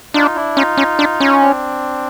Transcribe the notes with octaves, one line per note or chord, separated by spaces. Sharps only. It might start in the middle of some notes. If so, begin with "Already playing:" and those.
D4 D#4 F4
D4 E4
C#4 D#4 F4
C#4
D4
C#4
C4 D4